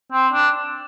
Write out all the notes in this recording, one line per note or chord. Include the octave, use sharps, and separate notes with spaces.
C4
D4